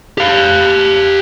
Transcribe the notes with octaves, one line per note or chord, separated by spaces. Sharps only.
G4 F5